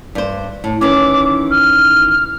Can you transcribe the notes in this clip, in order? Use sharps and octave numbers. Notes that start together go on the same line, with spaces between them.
G2 C5
A2
D#3 E3 C#4 D6
F6